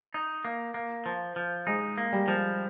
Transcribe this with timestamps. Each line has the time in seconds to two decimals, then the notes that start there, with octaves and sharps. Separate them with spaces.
0.14 D#4
0.45 A#3
0.74 A#3
1.06 F3
1.36 F3
1.67 G#3 D#4
1.98 A#3
2.12 G3
2.28 F3